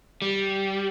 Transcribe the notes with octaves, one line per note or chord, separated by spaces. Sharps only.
G3